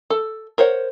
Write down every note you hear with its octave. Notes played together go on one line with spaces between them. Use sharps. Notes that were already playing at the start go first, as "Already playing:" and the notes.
A4
A#4 C5 C#5 F#5